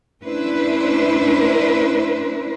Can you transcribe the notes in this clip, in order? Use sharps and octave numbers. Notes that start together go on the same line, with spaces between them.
A3 C#4 D4 E4 B4 C5